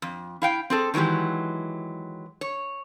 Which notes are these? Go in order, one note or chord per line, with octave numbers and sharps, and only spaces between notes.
F2
E4 F5 G5
C4 G#4 A4
D#3 E3 F#3 G#3 G4
C#5